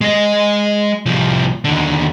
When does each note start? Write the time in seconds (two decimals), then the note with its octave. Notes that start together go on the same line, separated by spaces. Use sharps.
0.01 G#3 D#5
1.06 C2 F3
1.64 D#2 D3